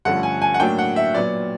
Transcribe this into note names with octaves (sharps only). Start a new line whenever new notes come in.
G2 D3 F3 A3 C#4 F#5
G#5
G#5
F#5
A2 F#3 A#3 D4 G5
F#5
E5
A#2 F#3 B3 D5